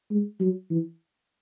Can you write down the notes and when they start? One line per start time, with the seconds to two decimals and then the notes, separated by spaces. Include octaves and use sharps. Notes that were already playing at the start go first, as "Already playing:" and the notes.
0.11 G#3
0.40 F#3
0.71 E3